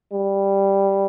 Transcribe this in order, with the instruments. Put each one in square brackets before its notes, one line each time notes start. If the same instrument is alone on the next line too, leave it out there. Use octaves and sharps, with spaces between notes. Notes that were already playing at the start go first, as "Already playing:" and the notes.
[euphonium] G3